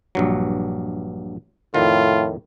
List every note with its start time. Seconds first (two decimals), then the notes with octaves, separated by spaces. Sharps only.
0.15 A#1 G2 F#3
1.74 F2 A2 D#3 F4